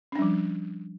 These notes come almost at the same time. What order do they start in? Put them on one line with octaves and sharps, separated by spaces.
C#4 D4 G3 F3